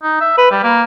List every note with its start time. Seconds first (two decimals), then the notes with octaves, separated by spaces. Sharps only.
0.03 D#4
0.21 E5
0.38 B4
0.51 G3
0.63 A#3